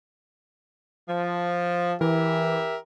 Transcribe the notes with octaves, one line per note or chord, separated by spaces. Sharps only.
F3
E3 G4 A#4 E5